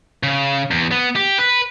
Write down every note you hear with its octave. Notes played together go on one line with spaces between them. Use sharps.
C#3
E2
B3
G4
B4